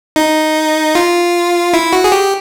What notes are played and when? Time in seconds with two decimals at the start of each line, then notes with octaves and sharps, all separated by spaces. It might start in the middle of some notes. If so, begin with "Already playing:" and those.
0.16 D#4
0.95 F4
1.73 E4
1.93 F#4
2.04 G#4
2.12 G4